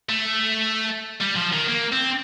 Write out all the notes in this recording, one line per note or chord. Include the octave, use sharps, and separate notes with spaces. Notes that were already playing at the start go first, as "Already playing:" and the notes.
A3
G3
F3
D#3
A#3
C4